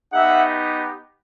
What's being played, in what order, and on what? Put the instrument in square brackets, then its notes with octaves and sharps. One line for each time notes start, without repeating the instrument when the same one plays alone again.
[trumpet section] B3 D#4 G4 E5 F#5